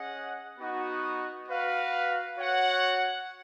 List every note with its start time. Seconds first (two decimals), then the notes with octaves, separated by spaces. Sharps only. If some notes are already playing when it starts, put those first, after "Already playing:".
Already playing: C#4 G#4 D#5 F#5
0.58 B3 D#4 F#4
1.48 F#4 B4 F5
2.37 F#4 C#5 F#5